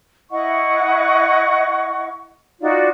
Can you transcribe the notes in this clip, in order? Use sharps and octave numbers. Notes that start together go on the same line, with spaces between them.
E4 D#5 F#5 C#6
D#4 F4 F#4 D5